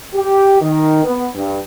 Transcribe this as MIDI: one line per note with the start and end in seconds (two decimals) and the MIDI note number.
0.14 0.60 67
0.61 1.03 51
1.03 1.26 59
1.35 1.57 43